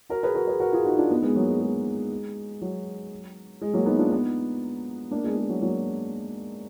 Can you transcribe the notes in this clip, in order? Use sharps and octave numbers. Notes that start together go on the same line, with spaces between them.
F#4 A#4
G#4 B4
F#4 A#4
G#4 B4
F#4 A#4
F4 G#4
D#4 F#4
D4 F4
B3 D#4
G#3 B3
F#3 A#3
G#3
G#3
F#3
G#3
F#3 A#3
B3 D#4
D4 F4
B3 D#4
A#3 D4
G#3 B3
G#3
F#3
F#3 A#3